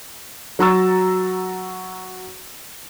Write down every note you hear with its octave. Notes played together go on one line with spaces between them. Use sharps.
F#3 F#4 A#5 C#6 E6 A6